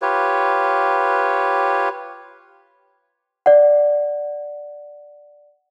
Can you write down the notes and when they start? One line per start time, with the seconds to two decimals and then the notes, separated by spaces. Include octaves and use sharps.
0.02 F4 G4 B4 C#5
3.46 D5 F#5